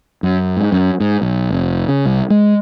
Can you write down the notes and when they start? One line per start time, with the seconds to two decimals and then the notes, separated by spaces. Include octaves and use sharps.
0.23 F#2
0.57 G#2
0.72 F#2
1.00 G#2
1.22 B1
1.50 F1
1.88 C#3
2.05 C2
2.30 G#3